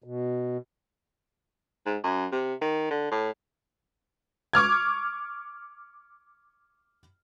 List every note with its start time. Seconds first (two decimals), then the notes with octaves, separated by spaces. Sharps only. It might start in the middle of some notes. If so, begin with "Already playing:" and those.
0.04 B2
1.86 G#2
2.03 F#2
2.32 C3
2.61 D#3
2.91 D3
3.11 A2
4.53 C#6 D6 F6 G#6